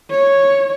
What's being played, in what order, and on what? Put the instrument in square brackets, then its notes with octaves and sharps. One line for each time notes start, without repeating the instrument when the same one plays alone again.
[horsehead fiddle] C#5